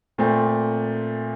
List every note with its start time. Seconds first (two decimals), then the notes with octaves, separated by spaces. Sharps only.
0.18 A#2 A3 C4